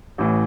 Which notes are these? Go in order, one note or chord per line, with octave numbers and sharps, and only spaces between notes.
A1 A2 E3